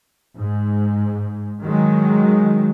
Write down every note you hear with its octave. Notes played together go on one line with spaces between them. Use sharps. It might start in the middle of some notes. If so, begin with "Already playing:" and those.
G#2
D#3 F#3 G#3